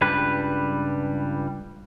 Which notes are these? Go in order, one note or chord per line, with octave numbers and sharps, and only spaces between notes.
C#2 G2 G3 B4